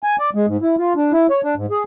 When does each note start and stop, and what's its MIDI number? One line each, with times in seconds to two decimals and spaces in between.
0.03 0.16 80
0.19 0.30 74
0.35 0.46 56
0.47 0.57 44
0.62 0.76 64
0.78 0.93 65
0.96 1.12 62
1.12 1.27 64
1.30 1.41 73
1.44 1.55 62
1.56 1.66 44
1.71 1.84 68